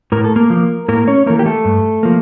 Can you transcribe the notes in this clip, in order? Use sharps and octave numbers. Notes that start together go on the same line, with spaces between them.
A2 A#4
A4
A#3 A#4
F3 A#3
A2 A#3 A#4
C#4 C#5
E3 A3 A#3 A#4
G4
A3 A4
G2
F3 A#3